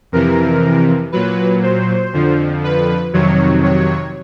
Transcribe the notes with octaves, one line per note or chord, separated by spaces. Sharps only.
F2 C3 E3 A#4
A#2 F#3 B4
C5
F2 D3 F3
B4
F2 C3 D#3 F#3 C#5
C#5